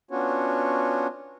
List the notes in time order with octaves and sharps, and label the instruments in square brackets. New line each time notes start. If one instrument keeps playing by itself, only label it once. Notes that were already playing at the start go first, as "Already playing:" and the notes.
[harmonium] B3 C#4 D4 F4 F#4 C#5